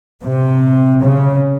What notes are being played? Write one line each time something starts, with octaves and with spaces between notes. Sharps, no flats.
C3
C#3